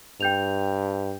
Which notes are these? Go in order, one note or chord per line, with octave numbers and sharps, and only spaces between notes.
G2 G5 G6 F7